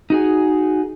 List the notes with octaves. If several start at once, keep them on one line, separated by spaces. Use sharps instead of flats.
D#4 F#4 G#4